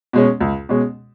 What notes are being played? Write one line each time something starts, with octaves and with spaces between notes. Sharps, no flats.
B2 G#3 C#4
C#2
B2 G#3 C#4